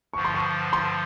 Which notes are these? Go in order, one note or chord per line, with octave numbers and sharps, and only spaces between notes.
G2 D3 F3 C#6
C6
C#6
C6